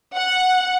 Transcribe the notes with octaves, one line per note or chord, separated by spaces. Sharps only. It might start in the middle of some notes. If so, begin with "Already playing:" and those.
F#5